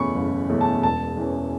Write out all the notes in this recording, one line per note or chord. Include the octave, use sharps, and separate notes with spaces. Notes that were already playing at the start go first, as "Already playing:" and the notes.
Already playing: F#1 E2 B2 A3 C#4 B5 C#6
F#1
E2 B2 A3 C#4
A5
E1 A5
E2 E3 C#4